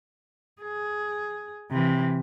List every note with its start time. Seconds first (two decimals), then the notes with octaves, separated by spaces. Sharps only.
0.62 G#4
1.71 C3 E3